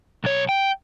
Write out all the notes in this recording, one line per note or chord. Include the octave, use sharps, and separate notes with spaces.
B1 C#5
G5